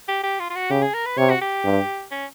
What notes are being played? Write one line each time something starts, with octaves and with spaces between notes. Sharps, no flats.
G4
G4
F4
F4
F#4
C#3 G4
G#4
A#4
B4
C3 C#5
F#4
G4
G2
C#4